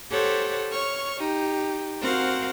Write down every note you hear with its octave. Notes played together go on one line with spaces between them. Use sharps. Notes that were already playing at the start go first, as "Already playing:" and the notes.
G4 A4 C5 C#5 F#5
C#5 C#6 F6
D#4 G4
C4 F#4 A#4 C5 F5 F#5